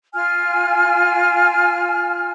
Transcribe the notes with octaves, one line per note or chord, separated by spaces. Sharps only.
F4 G#5 F6